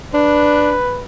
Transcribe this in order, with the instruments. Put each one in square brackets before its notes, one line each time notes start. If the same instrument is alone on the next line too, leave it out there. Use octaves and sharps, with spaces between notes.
[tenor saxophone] D4 [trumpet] B4